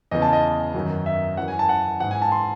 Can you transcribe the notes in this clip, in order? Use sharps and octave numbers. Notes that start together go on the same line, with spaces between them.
E2 C#3 E3 D#5
A5
D#5
F#2 D#3 F#3
E5
F#2 E3 F#5
G#5
A5
F#5
G#2 E3 F#5
G#5
A5
C6